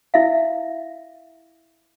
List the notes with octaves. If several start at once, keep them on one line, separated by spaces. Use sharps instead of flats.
E4 E5 F5